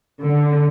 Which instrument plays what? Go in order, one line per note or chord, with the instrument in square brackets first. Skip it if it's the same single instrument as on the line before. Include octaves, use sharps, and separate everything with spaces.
[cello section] D3